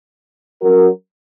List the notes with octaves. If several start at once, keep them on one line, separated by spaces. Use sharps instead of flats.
F#3 C#4 F#4 A#4